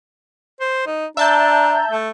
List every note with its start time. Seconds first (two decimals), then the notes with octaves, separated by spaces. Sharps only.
0.60 C5
0.86 D#4
1.17 D4 E5 A5 A#5 G6
1.91 A3